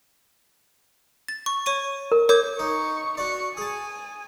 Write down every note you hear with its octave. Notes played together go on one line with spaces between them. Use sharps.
A6
C#6
C#5 C#6 D#7
A#4
A#4 C#5 D6 G6
D#4 C#6
F#4 D5 C#6
G#4 G#5 A5